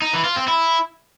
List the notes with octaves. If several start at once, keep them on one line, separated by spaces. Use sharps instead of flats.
D#4
E3
F4
C4
E4